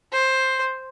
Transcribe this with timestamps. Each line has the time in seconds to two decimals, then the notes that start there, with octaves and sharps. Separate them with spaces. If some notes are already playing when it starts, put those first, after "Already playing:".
0.12 C5